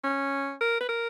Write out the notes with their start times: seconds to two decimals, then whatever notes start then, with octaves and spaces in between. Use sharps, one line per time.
0.04 C#4
0.61 A#4
0.81 B4
0.89 A#4